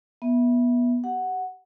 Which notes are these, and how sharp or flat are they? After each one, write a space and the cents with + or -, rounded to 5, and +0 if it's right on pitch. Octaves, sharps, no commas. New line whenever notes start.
B3 -20 E5 +0
G4 +0 F#5 +0